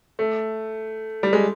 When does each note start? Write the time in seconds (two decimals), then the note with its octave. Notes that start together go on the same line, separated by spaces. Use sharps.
0.19 A3
1.23 G3
1.33 G#3